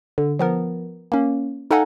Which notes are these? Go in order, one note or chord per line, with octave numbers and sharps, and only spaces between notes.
D3
F3 B3 A#4
A#3 C#4
D#4 A4 F5 F#5 G#5 A#5